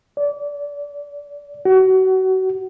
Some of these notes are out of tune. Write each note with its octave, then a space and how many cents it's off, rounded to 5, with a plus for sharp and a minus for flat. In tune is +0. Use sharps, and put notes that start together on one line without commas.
D5 -25
F#4 +30